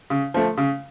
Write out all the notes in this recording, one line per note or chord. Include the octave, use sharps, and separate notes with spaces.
C#3
F3 A3
C#3